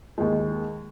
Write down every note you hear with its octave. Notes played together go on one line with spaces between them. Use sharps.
D#2 G#3